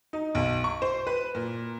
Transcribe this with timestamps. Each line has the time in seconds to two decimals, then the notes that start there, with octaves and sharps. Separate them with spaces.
0.13 D#4
0.35 B1
0.64 C#6
0.82 C5
1.07 B4
1.35 A#2